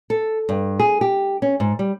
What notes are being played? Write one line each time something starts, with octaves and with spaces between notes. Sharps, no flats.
A4
G2
G#4
G4
C#4
G#2
G3